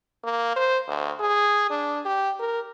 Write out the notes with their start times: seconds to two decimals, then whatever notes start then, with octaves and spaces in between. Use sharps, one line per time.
0.24 A#3
0.56 C5
0.87 D2
1.20 G#4
1.70 D4
2.05 G4
2.39 A#4